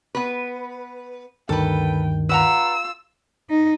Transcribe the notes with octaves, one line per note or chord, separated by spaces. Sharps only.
B3 B4
D2 G2 D#3 A4 B4 G5
F4 B4 F#5 A#5 E6
D#4